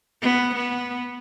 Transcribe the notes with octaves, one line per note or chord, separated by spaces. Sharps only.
B3
B3